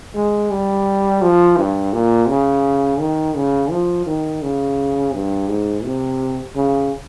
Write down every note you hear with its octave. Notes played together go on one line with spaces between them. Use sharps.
G#3
G3
F3
G2
A#2
C#3
D#3
C#3
F3
D#3
C#3
G2
G#2
C3
C#3